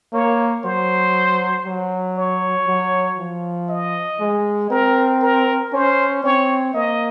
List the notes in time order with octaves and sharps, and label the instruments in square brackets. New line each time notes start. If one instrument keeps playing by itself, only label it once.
[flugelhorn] A#3 [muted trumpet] C#5
[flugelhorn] F#3 [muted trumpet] C5
[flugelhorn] F#3
[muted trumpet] C#5
[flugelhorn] F#3
F3
[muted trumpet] D#5
[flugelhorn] G#3
[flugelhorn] C4 [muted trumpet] A#4
[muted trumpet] A#4
[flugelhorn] C#4 [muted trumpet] C5
[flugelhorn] C4 [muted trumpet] C#5
[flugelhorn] A#3 [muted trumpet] D#5